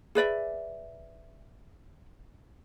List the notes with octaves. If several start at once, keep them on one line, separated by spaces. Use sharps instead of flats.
G#4 B4 D5 E5